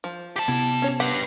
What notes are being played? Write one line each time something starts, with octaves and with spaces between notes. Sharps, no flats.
F3
G4 A5
C3 B3 E4
C#4 C#5
G4 B4 F#5